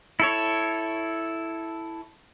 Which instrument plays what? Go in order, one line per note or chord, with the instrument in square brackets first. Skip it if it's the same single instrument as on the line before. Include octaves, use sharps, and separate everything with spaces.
[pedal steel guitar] E4 A4 C#5